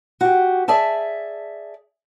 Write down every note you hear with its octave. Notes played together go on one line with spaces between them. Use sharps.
F#4 G4
G#4 D5 E5 A5